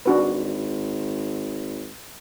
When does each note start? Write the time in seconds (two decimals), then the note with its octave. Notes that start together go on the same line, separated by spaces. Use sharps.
0.06 G#1 D4 F#4 B4